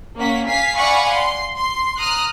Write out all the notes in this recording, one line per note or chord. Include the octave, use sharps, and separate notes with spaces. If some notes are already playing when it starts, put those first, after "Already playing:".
A#3 C#4 F#5 B6
F5 G#5 B6 C7
D5 F5 F#5 G#5 B5 C#6
C6
C6
A#5 D#6 F6 F#6